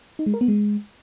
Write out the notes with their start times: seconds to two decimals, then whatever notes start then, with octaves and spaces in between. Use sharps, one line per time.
0.19 D#4
0.26 G#3
0.34 A#4
0.41 B3
0.48 G#3